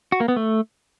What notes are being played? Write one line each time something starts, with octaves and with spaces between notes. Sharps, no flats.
F#4
A#3
B3
A3